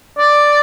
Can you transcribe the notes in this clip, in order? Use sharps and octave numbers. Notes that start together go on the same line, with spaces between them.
D5